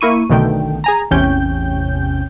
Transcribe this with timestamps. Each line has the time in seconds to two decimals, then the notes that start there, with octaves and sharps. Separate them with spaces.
0.01 A#3 E4 C#6 D#7
0.29 B1 B2 D3 D#3 A3 G5
0.84 G#4 G#5 A#5
1.11 A1 E2 C3 C#4 G5 G6